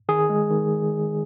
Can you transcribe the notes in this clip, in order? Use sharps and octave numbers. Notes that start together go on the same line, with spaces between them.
D#3 G#4
G#3
D#3